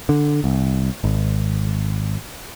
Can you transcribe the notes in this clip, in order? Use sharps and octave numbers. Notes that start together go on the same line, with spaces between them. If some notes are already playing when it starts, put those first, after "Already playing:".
D3
C2
G#1